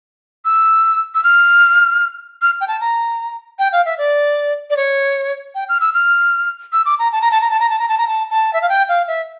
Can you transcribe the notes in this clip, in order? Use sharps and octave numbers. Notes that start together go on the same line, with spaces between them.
E6
E6
F6
F6
G5
A5
A#5
G5
F5
E5
D5
D5
C#5
G5
F6
E6
F6
E6
D6
A#5
A5
A#5
A5
A#5
A5
A#5
A5
A#5
A5
A#5
A5
A5
E5
F5
G5
F5
E5